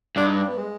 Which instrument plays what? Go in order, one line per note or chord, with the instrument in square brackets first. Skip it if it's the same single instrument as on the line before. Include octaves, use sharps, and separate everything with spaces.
[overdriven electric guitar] G2 [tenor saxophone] D4
[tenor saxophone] D#4
D4
B3
G#3